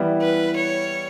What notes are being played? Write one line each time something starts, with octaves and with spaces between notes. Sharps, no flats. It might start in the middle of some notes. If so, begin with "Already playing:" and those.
Already playing: E3 G3 B3 E4
B4
C#5